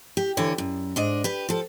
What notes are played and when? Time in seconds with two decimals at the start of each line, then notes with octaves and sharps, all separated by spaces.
0.17 G4
0.37 D2 D3 E3 C#5
0.58 F#2
0.96 G#2 D4 D#5
1.24 G4 B4
1.49 F3 A4